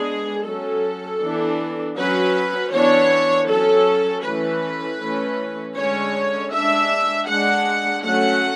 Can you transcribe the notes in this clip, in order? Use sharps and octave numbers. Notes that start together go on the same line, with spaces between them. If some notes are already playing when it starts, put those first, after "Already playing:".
Already playing: G#3 B3 D4 G#4
F#3 C#4 A4
E3 B3 D4
F#3 C#4 B4
E3 B3 D4 C#5
F#3 C#4 A4
E3 A3 C#4 B4
E3 A3 C#4
D3 G#3 C#4 C#5
G#3 D4 E5
G#3 D4 F#5
F#3 A3 C#4 F#5